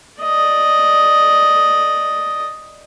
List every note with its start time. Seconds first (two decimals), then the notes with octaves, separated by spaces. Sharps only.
0.22 D5 D#5